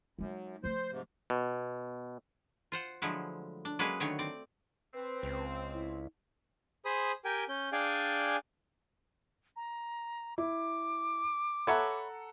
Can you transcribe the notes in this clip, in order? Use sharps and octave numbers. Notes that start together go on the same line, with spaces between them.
F#2 G#3 D#4
F3 A3 C5
G#2 C3
B2
F4 C5 F#5
D3 F3 F#3 G#3 A3 E4
D4
F#3 G#3 A#3 C#4 G#4 B4
D3 D#3 F#3 A3 C#5
C4 D5
C4 B4
C#2
E4
G#4 C5 B5 D#6
G4 A#4 G5 G#5
C#4 G6
D4 G#4 D5 F5 G5 G#5
A#5
E4 D6
A4 B4 C#5 E5 F#5 A#5